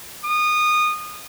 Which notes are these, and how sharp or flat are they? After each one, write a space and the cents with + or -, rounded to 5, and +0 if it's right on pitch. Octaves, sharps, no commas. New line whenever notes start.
D#6 -20